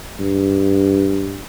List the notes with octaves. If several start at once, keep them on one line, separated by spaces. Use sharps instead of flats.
G2